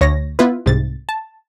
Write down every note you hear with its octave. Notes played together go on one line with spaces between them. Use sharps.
D2 C#5 A#6
B3 E4 F4 B4
C2 G#2 C3 A6
A5